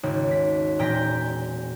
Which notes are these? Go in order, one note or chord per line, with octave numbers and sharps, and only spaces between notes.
G#1 D#2 C#3
B6
E1 A#2 G5 A#5 G6 B6